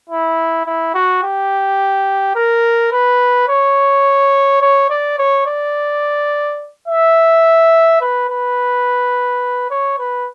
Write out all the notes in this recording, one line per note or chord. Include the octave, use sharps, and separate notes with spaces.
E4
E4
F#4
G4
A#4
B4
C#5
C#5
D5
C#5
D5
E5
B4
B4
C#5
B4